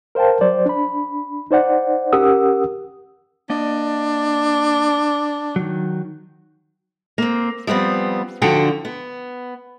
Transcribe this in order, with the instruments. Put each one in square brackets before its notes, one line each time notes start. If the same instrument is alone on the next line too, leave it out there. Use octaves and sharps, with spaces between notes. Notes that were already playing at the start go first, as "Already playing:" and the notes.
[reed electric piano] A#4 C5 F5 G5 A5
F#3 C5 D5
D4 B5
D#4 C5 D5 F#5
C#4 G4 A#4 F#5 D#6 E6
[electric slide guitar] A#3 D5 D#5 [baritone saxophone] D4
[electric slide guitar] D#3 F#3
[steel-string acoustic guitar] A#3 C4
F3 G3 B3 C4
D3 F3 D4 F#4 F#5 G5
B3